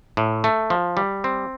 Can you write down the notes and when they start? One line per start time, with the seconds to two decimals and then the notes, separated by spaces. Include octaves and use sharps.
0.17 A2
0.44 A3
0.70 F3
0.97 G3
1.24 C4